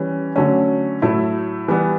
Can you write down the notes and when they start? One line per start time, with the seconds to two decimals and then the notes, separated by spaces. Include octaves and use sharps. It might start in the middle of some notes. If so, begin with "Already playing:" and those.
Already playing: E3 G3 C#4
0.36 D3 F#3 A3 C#4
1.02 A2 F#3 A3 E4
1.68 E3 G3 B3